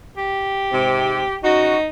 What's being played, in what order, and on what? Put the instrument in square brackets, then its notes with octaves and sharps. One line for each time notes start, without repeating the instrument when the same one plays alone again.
[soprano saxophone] G4
[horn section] G#2 C3
[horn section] C#3 F#4 [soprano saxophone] D#4